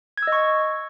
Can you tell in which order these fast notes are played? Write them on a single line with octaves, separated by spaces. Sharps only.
G#6 E6 D#5 C#6